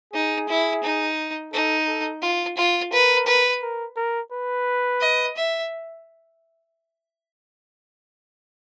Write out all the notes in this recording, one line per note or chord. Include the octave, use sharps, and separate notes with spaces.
D#4 G#4
E4
D#4
D#4 A4
A4
F4
F4
A#4 B4
B4
A#4
A#4
B4
D#5
E5